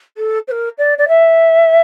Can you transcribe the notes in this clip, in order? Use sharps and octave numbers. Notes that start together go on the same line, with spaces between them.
A4
C5
A#4
D5
D5
E5